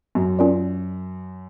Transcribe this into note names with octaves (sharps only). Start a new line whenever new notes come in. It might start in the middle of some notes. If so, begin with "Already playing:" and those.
F#2
C#4 F4 A#4 D5